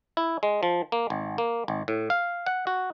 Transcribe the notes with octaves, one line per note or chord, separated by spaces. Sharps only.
E4
G#3
F3
A#3
G#1
A#3
G#1
A2
F5
F#5
F#4